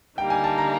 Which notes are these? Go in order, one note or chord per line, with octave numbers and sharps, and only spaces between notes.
D3 G3 A#3 D#4 G5
G#5
A5
A#5